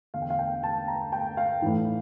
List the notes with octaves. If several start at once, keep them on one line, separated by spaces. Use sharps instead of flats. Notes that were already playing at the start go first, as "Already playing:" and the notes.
E2 D3 F5
G5
F5
G5
A5
A#5
G5
F5
A2 E3